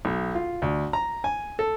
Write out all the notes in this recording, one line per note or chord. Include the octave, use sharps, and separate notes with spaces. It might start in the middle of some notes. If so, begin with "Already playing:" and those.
B1
F4
D2
A#5
G#5
A4